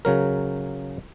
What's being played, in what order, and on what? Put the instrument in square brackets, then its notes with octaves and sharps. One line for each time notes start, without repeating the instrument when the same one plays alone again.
[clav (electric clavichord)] C#3 F#3 A#4